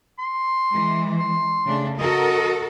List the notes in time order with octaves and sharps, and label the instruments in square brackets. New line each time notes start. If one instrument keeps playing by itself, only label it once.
[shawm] C6
[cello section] E3 G#3
[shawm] C6
[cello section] C#3 A3 D4
[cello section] F#4 A4 A#4 [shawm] D#5